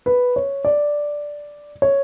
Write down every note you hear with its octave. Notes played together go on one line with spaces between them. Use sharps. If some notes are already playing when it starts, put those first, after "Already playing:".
B4
C#5
D5
C#5